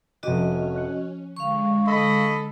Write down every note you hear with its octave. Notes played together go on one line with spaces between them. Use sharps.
F1 C#4 F#4 G4 D#5
F#6 C#7
D3 G#3 F5 C#6
A4 D#5 B5